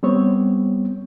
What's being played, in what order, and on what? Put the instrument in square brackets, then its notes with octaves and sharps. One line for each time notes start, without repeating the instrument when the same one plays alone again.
[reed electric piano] G3 B3 C4 C#5